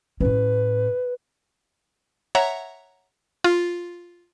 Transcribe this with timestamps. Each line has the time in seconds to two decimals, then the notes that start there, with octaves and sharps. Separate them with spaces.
0.20 A2 C#4 B4
2.35 C#5 E5 F#5 A#5
3.44 F4